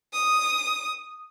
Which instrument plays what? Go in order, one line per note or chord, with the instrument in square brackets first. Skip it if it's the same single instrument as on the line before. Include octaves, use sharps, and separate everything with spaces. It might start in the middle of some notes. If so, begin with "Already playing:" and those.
[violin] D#6